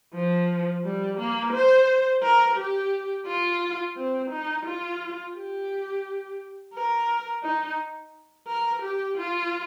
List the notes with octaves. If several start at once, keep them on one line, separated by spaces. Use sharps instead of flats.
F3
G3
A#3
C5
A#4
G4
F4
C4
D#4
F4
G4
A#4
D#4
A#4
G4
F4